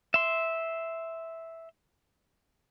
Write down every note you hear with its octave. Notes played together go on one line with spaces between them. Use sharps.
E5 C6